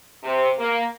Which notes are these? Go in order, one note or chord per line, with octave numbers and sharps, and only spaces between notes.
C3
A#3